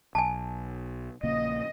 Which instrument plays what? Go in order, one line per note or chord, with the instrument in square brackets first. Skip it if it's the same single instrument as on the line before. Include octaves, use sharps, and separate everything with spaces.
[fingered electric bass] B1 [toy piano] G#5 A5
[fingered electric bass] A#1 C#3 A#3 [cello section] D#5